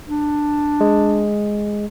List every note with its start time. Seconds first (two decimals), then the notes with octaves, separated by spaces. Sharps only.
0.08 D4
0.80 G#3